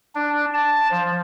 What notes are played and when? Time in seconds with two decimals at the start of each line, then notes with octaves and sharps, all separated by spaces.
0.15 D4
0.54 A5
0.91 F3